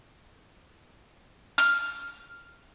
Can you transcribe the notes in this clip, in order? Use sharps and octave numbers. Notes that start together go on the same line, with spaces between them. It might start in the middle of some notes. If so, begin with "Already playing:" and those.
F6